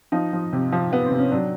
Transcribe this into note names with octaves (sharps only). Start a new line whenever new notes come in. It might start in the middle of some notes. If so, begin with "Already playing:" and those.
F3 D#4
F3
C3
F3
F3 B3
C4
C3
C#4
F#3 D4